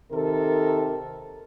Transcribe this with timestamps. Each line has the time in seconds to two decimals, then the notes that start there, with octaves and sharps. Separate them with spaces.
0.11 C3 D#3 A4 A#4